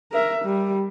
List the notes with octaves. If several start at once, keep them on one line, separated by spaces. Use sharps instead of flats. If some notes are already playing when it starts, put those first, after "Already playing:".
A#4 E5
G3